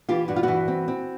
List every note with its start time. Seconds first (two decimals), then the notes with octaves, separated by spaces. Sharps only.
0.09 E3 F4 G4
0.28 G2 F#4
0.36 F4
0.43 E3 E4 F#4
0.68 C4
0.88 C4